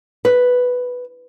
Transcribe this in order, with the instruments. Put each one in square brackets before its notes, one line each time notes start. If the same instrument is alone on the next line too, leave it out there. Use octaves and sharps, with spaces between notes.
[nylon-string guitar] B4